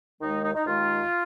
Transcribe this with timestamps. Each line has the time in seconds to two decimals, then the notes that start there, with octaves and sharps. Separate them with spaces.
0.21 D#2 D#3 G#3 D#4
0.44 D#4
0.55 D#4
0.66 D#2 D#3 G#3 F4